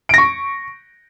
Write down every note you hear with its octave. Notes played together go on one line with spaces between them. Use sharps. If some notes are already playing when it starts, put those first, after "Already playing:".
C#6 A#6 D7